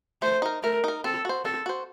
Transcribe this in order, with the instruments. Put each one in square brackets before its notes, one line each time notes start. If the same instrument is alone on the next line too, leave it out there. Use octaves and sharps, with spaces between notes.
[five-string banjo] A3 [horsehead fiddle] C5
[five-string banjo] D#4 A#4
[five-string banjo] A3 [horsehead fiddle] A#4
[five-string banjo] D#4 A#4
[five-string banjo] C4 [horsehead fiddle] A4
[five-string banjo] F#4 C5
[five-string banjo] C4 [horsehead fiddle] A4
[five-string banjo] F#4 C5